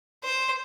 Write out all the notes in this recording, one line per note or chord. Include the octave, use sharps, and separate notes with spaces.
C5